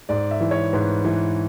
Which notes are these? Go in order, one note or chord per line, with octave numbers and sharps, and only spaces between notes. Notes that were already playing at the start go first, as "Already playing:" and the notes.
G#2 D5
E5
E3
C#5
G#2 B4
E3